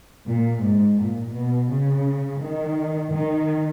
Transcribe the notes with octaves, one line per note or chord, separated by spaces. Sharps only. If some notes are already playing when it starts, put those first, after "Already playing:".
A#2
G#2
A#2
B2
C#3
D#3
D#3